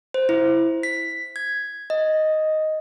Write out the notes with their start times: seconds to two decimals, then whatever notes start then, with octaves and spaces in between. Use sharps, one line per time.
0.14 C5
0.29 E4
0.83 B6
1.36 G#6
1.90 D#5